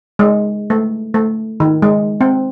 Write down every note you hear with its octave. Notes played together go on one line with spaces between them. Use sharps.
G#3
A3
A3
D#3
G#3
C4